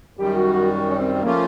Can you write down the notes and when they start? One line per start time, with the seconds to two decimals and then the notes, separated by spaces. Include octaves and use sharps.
0.17 F#2 D#3 G3 G4
0.35 F#4
0.53 F#4
0.70 F#4
0.90 C#4
0.97 C4
1.22 C#3 F3 A3 A#3 C#4 F4